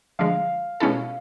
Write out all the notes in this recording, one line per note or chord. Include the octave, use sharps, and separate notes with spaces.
D3 F3 G#3 F5
B2 G#3 C#4 E4 A4